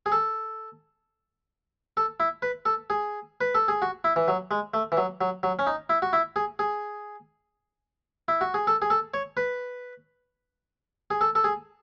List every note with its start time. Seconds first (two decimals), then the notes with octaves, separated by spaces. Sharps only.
0.06 G#4
0.12 A4
1.97 A4
2.20 E4
2.42 B4
2.66 A4
2.90 G#4
3.41 B4
3.55 A4
3.68 G#4
3.82 F#4
4.04 E4
4.16 E3
4.28 F#3
4.51 G#3
4.74 A3
4.92 E3
4.97 F#3
5.21 F#3
5.43 F#3
5.59 C#4
5.67 D#4
5.90 E4
6.02 F#4
6.13 E4
6.36 G#4
6.59 G#4
8.28 E4
8.41 F#4
8.54 G#4
8.67 A4
8.82 G#4
8.90 A4
9.14 C#5
9.37 B4
11.11 G#4
11.21 A4
11.35 A4
11.44 G#4